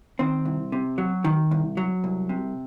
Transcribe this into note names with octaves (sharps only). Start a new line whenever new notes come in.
D#3 C4
C2
C3
F#3
D#3
C2
F#3
C2
C3